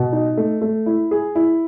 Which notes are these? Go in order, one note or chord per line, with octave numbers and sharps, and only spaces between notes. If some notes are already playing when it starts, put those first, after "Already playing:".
Already playing: B2
D#4
A3
A3
E4
G#4
E4